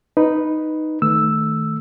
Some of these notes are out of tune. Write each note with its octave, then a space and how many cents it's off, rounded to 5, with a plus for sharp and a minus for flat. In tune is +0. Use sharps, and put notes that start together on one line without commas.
D#4 +0 B4 +0
D#3 +0 A3 -5 E6 +0